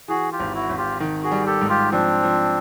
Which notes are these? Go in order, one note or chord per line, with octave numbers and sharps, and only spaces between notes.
E3 F#4 G#4
F4 G4
G#1
E4 F#4
G#1
F4 G4
D#3
F#4 G#4
G3
G4 A4
G#2
F4 G4
F3 C4 D4
F3